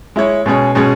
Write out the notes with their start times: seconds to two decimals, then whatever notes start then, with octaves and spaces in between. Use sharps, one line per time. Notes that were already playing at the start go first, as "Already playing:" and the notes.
0.16 G#3 E4 C#5
0.46 B2 G#3 C#4 G#4 C#5
0.75 B2 G#3 C#4 G#4 C#5